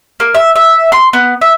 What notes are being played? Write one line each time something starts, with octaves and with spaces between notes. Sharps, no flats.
A#3
E5
E5
C6
B3
E5